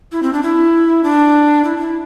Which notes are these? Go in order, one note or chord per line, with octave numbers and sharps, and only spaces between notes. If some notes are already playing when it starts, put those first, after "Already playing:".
E4
C4
D4
E4
D4
E4
D4
E4